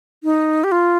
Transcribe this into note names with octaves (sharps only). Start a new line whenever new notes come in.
D#4
G4
F4